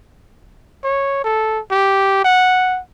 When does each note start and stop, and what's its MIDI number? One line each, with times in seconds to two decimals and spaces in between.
0.84 1.22 73
1.24 1.60 69
1.71 2.21 67
2.24 2.80 78